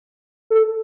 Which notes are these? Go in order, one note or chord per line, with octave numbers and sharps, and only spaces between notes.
A4